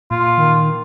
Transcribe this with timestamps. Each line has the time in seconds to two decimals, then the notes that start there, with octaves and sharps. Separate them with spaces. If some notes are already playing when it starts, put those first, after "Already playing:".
0.11 A#2 F4
0.38 D#3